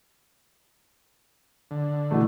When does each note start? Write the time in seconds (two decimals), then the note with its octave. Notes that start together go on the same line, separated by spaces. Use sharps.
1.71 D3
2.11 B2 E3 A3